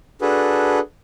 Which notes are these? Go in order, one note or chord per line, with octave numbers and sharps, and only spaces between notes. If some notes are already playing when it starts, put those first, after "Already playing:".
D4 F#4 G#4 A4 B4